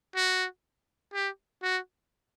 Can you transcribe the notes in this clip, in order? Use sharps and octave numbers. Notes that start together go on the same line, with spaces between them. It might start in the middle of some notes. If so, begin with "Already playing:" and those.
F#4
G4
F#4